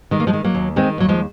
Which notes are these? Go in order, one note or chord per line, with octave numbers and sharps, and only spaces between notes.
D#3 G#3
A#3
F3 G#3
D#3
F#3 A#3
D#2
D#3 G#3 C4
D#2 F#3
F3 G#3